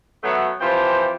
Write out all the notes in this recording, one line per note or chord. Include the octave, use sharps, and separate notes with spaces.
F#3 A3 B3
E3 F3 C4 F4 G4 C5